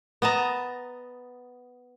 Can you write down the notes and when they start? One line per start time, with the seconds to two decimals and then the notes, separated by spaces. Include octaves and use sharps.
0.22 B3 D#5 A5 A#5